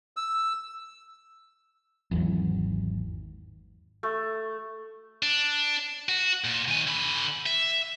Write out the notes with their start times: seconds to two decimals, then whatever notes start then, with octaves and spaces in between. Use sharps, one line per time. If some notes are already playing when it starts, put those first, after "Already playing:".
0.17 E6
2.11 G#1 E2 E3 F#3
4.03 A3
5.23 D4
6.09 F#4
6.44 A#2
6.68 D#3 G#5
6.87 D3 B5
7.46 E5